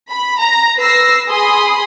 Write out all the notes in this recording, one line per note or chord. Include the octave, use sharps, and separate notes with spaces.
B5
A#5
B4 E6 A#6 C7
G#4 B5 C6 D#6